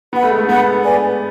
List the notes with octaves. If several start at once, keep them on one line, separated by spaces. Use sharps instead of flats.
B3 B4 F#5 B5
A3
G#3
A3
B3 B4 F#5 B5
B4 D5 G#5